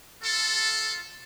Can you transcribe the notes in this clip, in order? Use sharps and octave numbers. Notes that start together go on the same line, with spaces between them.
F4 A4